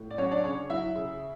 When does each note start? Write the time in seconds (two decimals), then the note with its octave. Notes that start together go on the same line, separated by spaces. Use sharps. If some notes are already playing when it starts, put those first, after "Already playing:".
Already playing: A2
0.11 D5
0.18 F#3 C#4 C#5
0.31 D4 D5
0.44 C#3 C#4 C#5
0.70 F#3 E4 E5
0.96 C#3